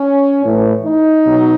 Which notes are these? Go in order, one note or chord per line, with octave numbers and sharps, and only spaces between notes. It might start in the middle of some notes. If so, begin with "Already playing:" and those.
Already playing: C#4
A2 E3
D#4
B2 F#3